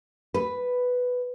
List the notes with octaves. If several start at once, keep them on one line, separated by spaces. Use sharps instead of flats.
B4